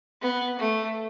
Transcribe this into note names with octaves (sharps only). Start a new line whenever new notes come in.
B3
A3